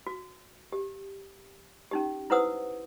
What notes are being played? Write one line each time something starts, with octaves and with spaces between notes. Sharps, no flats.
F#4
G4
C#4 D#4 G4
E4 B4 C5 F#5 D#6 E6